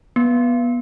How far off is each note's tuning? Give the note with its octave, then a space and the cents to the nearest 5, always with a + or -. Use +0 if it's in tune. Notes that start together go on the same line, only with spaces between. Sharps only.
B3 -15